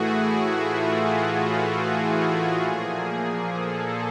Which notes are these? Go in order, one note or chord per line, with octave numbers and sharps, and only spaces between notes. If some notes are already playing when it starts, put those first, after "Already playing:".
Already playing: A2 E3 A3 E4 F#4 G#4
E4
F4
F4
E4
G#4
A#2 F3 A#3
A4